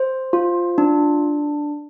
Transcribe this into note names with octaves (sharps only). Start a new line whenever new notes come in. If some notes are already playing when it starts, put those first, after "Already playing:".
Already playing: C5
F4
D4